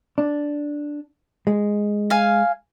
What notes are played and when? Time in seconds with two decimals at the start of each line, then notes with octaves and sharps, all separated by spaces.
0.18 D4
1.47 G#3
2.10 F5 G#5